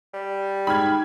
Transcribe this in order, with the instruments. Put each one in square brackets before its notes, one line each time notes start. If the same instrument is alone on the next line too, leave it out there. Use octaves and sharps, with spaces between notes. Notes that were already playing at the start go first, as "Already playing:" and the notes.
[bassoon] G3
[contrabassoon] G#2 [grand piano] G5 F6 [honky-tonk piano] B5 G#6